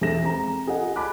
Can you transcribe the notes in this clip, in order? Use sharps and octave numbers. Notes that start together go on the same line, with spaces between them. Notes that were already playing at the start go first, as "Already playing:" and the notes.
E2 G#3 A4 E5 A#6 E7
C4 A#5
F4 G#4 A4 D#5 F#5
G#5 A5 B5 D6 F#6